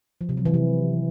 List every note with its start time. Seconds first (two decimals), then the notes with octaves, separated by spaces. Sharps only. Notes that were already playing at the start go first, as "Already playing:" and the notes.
0.21 F3
0.29 C3
0.37 F#3
0.45 E3
0.54 C3